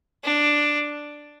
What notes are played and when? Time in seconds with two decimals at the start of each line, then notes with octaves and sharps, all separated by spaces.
0.24 D4